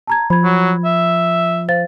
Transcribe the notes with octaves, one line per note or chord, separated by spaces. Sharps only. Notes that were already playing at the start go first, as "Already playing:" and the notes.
A5 A#5 G#6
F3 B5 G#6
F#3
E5
C5 F5 A6